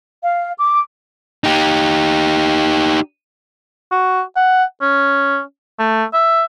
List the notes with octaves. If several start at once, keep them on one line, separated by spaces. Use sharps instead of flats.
F5
D6
D#4 G4
F#4
F#5
C#4
A3
E5